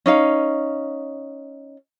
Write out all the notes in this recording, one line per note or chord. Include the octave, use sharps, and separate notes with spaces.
C#4 D#4 F5